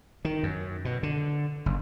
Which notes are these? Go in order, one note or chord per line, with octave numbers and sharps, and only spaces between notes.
D#3
F#2
B2
D3
F#1